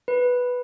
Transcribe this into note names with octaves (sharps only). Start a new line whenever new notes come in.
B4